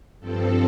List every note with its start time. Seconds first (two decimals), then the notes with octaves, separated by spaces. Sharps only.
0.20 G2 F3 C4 A4